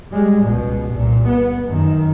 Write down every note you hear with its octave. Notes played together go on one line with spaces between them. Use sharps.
G3 G#3
C#2 B2
C2 A#2
B3
F#2 D#3